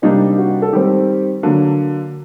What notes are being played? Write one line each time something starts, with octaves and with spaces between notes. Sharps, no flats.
C3 G3 A#3 D4 D#4
F#4
A4
D#3 G3 C4 G4
D3 F#3 A#3